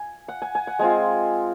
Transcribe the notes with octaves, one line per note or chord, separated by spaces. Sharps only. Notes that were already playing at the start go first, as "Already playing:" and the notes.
Already playing: G#5
F#5
G#5
G#5
F#5
G#3 C4 F4 G#5